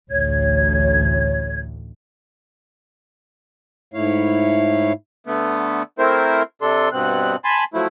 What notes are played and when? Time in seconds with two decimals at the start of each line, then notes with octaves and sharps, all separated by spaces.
0.10 A1 D2 C#5 G#6
3.94 G#2 A3 E4 C#5 F5
5.27 D3 A3 B3
5.99 A3 C4 E4 A#4 C5
6.62 C3 D4 A4 C6
6.92 G2 B2 C4 F#6
7.44 G#5 A5 B5 C6
7.74 F3 F#3 A3 E4